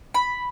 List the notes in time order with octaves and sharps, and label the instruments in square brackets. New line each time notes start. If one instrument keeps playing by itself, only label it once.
[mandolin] B5